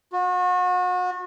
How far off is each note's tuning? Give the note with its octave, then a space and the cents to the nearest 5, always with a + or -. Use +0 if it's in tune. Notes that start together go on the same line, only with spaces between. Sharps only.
F#4 -35